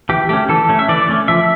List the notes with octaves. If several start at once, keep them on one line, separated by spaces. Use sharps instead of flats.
E3 G4
A3 C#4 G4
E3 A4
A3 C#4
E5
E3 D5
A3 C#4
F3 E5